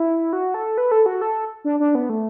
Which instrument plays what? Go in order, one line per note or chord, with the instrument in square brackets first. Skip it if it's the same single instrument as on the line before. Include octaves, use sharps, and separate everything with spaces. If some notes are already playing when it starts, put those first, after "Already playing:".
Already playing: [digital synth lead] E4
F#4
A4
B4
A4
F#4
A4
D4
D4
B3
A3